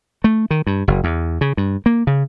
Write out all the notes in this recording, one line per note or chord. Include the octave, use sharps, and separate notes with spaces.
A3
D#3
G2
F#1
E2
C#3
G2
A#3
C#3